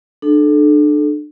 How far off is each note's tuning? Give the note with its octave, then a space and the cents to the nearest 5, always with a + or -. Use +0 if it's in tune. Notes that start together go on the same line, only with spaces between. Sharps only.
D4 +30 A4 -25